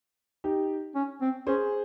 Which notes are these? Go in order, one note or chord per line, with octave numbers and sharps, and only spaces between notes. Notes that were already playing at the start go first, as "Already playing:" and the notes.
D#4 G4
C#4
C4
C#4 G#4 C5